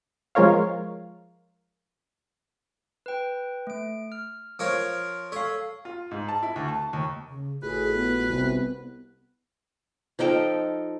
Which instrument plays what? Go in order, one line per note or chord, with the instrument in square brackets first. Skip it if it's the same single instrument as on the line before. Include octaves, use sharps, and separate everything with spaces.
[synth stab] F3 G#3 F4 A#4 C#5 F5
[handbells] B4 G5
A3 D7
F6
[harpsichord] F3 A#4 C#5
[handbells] A4 F5 [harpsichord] C#5
[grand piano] F4
G#2
A5
E4
D2
A5
D#2
[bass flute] C#3
[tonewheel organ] G#1 F4 F#4 [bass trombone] A2 [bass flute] G#4 [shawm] B4
[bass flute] B3
[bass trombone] C2 [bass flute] B3
[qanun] F3 D#4 A4 G5